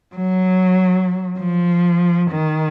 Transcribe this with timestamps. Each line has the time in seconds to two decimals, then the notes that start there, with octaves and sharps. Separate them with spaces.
0.16 F#3
1.39 F3
2.31 D#3